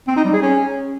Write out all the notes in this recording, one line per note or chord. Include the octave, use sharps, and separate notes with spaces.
C4
D#4
G3
G#4
C#4